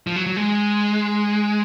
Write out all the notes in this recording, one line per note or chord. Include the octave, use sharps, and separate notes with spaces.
F3
F#3
F#3
G#3